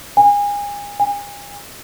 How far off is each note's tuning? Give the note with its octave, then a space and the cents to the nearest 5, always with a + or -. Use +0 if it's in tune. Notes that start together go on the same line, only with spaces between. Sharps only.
G#5 -30
G#5 -35